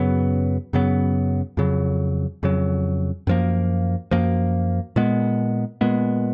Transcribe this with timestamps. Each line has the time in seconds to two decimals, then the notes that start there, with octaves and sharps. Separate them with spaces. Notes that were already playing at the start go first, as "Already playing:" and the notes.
Already playing: F#2 C#3 F#3 B3
0.73 F#2 C#3 F#3 B3
1.57 F2 C#3 F#3
2.43 F2 C#3 F#3
3.27 F#2 F3 A#3
4.11 F#2 F3 A#3
4.96 A#2 G#3 B3
5.81 A#2 G#3 B3